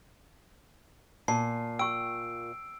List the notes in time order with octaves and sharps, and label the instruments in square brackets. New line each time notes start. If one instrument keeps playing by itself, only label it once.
[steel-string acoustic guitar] A#2 [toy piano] A5 [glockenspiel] C7
[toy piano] G5 C#6 [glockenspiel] E6 D7